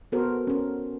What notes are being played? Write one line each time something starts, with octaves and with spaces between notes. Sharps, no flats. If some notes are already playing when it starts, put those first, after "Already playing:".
B3 F#4 A4 A#4 C5
C#4 A#4